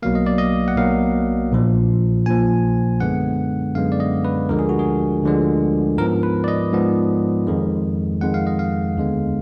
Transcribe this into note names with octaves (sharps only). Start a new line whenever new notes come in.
B1 B2 F#3 A#3 F5
D#5
D5
D#5
F#5
B1 B2 F#3 A#3 F5
A#1 A#2 F3
A#1 A#2 F3 G#5
F#2 D3 G#3 B3 F#5
F#2 D3 G#3 B3 F5
D5
D#5
B4
D2 D3 F3 G#3 A#4
G#4
F#4
G#4
D2 D3 F3 G#3
G#2 F3 B3 A#4
B4
D5
D#5
G#2 F3 B3
F2 D#3 G#3
F2 D#3 G#3 F#5
F5
D#5
F5
D#2 D3 G#3 B3